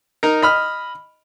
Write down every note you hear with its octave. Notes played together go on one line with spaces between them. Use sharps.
D#4 A#4
D#5 B5 F6